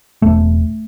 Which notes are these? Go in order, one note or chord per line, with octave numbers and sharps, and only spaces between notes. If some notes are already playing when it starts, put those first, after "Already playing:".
E1 A3